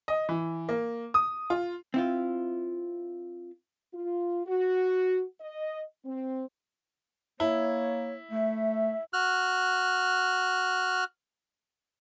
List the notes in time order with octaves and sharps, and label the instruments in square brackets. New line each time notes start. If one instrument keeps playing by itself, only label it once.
[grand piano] D#5
E3
A#3
D#6
F4
[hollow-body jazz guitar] C4 E4 F4
[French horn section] F4
F#4
D#5
C4
[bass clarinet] A#3 [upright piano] E4 [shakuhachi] C#5
[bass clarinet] A3 [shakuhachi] E5
[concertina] F#4 F6 F#6